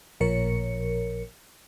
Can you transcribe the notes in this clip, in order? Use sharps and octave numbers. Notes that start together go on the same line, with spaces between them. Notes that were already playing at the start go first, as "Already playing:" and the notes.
A1 A#2 F3 A#4 C#5 C#7